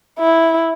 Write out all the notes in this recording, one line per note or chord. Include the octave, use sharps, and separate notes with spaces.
E4